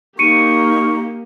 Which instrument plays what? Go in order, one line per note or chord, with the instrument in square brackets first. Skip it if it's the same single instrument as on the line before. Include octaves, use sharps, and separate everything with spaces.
[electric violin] A#3 G4 [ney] D#4 [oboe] C#6 [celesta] C#7 D#7